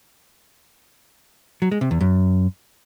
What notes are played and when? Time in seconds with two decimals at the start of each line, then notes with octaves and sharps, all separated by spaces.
1.62 F#3
1.71 G#3
1.81 C3
1.91 E2
2.01 F#2